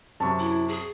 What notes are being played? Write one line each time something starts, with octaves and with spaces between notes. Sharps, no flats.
F#2 C3 A5 C#6
E4
G#4